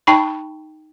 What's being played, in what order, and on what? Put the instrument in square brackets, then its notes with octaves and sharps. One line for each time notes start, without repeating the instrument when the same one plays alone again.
[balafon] D#4 G5 A5 B5 C#6